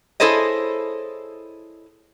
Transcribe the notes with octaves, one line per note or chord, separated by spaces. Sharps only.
E4 G#4 A4 C5 C#5 D#5